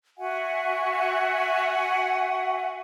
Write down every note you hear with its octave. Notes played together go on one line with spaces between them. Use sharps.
F#4 E5 F#5 G#5